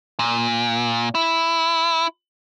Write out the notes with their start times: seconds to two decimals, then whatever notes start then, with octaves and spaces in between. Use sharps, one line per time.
0.19 A#2
1.15 E4